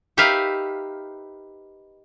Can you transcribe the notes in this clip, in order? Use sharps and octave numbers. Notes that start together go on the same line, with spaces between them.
D#4 G4 A#4 B4 E5 F5